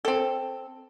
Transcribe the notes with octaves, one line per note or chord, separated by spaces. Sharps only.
C4 A4